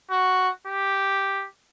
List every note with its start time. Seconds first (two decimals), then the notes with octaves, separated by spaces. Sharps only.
0.11 F#4
0.67 G4